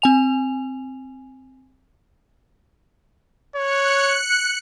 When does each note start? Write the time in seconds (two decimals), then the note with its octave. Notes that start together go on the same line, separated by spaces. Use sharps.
0.02 C4 G#5 F7
3.56 C#5 F#6 C#7